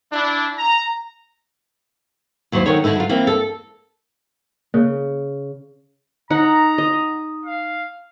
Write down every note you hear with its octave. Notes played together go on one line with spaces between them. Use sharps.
D4 E4
A#5
D#2 F#3 E4 C5
D3 D#3 A#4 C#5
D3 A3 D#4 E4 A4
F#3 F4
E3 A#3 C4 E4
A4
C#3 A#3
D#4 F#5 A#5
D#5
F5